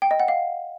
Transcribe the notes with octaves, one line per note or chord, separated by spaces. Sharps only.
G5
D#5
F#5
F5